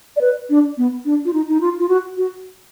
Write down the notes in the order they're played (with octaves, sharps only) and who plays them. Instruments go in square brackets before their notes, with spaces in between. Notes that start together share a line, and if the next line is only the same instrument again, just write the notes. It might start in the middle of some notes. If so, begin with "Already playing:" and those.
[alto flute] D5
B4
D4
B3
D4
F4
D#4
D#4
F4
F4
F#4
F#4